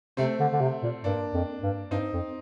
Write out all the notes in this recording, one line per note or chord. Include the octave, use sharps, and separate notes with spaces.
C3 A3 C4
D3
D3
C3
A#2
G2 A#3 D4
F2
G2
G2 C4 D#4
F2